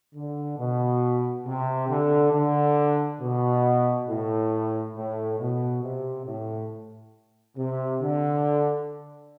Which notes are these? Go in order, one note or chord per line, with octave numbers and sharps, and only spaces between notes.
D3
B2
C3
D3
D3
B2
A2
A2
B2
C3
A2
C3
D3